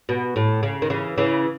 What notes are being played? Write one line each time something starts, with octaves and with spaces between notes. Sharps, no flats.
B2
A2
C#3
D#3
C#3 E3
C#3 E3